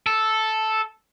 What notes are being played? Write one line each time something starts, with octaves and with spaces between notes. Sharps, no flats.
A4